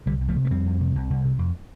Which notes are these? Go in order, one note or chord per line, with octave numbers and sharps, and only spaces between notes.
C2 D3 G3
C2
F3 A3
C3
A3
F2 G3 C4
F2
C3
C2
C2
C3
F2